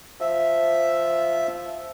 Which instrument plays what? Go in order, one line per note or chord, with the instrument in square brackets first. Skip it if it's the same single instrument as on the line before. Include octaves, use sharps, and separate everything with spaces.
[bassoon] F3 [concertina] E5